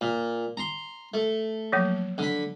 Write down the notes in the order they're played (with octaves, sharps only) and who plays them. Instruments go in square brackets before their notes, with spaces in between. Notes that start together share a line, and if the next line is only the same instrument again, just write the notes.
[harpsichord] A#2
A#5 C6
A3
[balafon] F3 F#3 A#3
[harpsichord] D3 B5